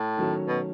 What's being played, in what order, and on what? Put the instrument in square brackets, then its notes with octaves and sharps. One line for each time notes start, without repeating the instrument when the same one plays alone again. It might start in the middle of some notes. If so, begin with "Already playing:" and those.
Already playing: [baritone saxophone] A2
[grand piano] D#3 F#3 A3 C#4
[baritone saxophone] B2